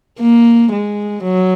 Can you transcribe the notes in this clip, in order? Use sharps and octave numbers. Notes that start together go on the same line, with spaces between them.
A#3
G#3
F#3